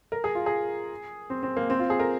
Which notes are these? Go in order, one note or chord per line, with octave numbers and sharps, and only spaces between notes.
A#4
G#4
F4
G#4
C4
C4
A#3
C4
F4
G#4
A#4